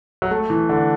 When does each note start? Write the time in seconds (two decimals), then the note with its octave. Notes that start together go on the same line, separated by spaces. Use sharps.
0.22 F#3
0.31 A3
0.50 E3
0.69 D3